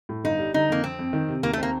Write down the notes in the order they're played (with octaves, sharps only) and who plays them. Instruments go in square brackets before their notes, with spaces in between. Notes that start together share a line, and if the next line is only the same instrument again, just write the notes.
[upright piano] A2
[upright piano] G1 [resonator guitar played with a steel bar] D#4
[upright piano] G3
[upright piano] D3 [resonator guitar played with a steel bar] D#4
[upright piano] F2 [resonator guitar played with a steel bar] A#3
[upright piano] F2 [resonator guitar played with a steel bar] C4
[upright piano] F2
D#3
C3
[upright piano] D#2 [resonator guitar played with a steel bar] A#3
[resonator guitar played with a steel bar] A3
[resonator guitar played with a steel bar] A#3 [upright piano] C4